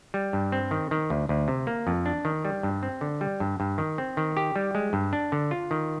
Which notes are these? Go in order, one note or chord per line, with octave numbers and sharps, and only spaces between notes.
G3
G2
C4
D#3
D#3
D2
D2
C3
A#3
F2
D4
D#3
G3
G2
C4
D3
G3
G2
G2
D#3
C4
D#3
G4
G3
G#3
G2
D4
D3
F4
D#3